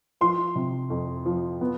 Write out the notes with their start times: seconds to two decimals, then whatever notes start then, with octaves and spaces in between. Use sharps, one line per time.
0.21 F3 C6
0.55 C3
0.90 F2
1.26 F3
1.61 B3